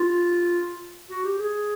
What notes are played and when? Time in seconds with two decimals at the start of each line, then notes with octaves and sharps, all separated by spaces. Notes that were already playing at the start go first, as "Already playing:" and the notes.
Already playing: F4
1.10 F#4
1.24 G4
1.39 G#4